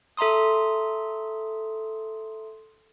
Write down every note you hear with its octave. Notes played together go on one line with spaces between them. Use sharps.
A4 E5 A#5 C6 D#6